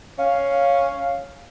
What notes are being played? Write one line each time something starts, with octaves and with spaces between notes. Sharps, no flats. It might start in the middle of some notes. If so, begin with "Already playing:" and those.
C#4 F5